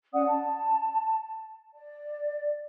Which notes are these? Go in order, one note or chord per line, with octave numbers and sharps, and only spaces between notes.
C#4 D5 F#5 D#6
A5
D5